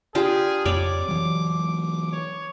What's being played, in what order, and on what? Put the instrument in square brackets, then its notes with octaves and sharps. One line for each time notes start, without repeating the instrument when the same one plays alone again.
[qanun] D4 F4 G4 [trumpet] G#4
[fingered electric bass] F2 [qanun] C#5 D5 B5 [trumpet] D6
[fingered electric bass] E3 F#3
[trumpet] C#5